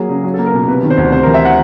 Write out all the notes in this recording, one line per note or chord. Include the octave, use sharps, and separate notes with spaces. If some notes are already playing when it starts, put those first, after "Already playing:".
Already playing: F#3 A#3 G#4
C#3
F#3
A#3 A4
A#4
B2
C3 B4
D#3
C5
D2
C3 C5
E3 A#4
E5
F#5